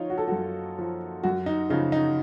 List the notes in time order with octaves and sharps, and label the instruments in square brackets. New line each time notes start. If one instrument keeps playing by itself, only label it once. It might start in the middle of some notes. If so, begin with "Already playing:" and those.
Already playing: [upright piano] F3 D#4 F4 C#5
F#4
A4
F#2 F#4
F3
F#2 F#4
D#4
C#3 F3 D#4
D#4